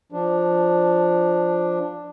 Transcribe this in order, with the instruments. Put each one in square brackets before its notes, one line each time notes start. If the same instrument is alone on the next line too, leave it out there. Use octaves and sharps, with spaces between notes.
[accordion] F3 D4